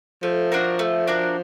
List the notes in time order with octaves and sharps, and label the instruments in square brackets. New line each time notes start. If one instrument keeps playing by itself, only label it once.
[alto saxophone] F3 [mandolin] A3
[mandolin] D4 F#4 A#4
A3
D4 F#4 A#4